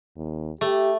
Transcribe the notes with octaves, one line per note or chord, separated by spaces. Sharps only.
D#2
A3 G4